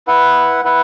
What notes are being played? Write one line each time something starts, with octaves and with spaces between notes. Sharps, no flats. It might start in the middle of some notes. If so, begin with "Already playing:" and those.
E4 B4 F#5
E4 B4 F#5